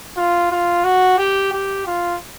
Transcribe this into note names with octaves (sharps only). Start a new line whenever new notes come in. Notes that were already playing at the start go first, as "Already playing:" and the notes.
F4
F4
F#4
G4
G4
F4